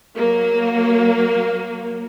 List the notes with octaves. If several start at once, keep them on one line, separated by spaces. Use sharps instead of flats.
F#3 A#3